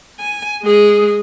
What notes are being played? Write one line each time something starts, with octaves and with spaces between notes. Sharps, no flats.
G#5
G#3 G#4